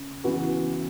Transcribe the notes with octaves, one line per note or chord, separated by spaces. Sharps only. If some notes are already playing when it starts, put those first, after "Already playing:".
Already playing: C#3
C#3 E3 B3 F#4 B4